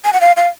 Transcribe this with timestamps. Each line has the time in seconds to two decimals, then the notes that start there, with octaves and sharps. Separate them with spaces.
0.05 G#5
0.13 F#5
0.21 F5
0.37 F5